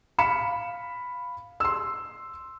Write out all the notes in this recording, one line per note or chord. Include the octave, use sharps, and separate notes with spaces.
F5 B5 C#7 E7
C6 E6